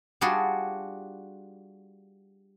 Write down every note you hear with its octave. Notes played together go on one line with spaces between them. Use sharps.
G3 D4 F4 F#4 G#4